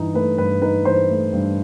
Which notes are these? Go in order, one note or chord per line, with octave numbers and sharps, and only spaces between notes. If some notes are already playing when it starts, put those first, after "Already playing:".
Already playing: G2 E3 D#4
A3 B4
G2 B4
D#4 B4
E3 C5
A3
G2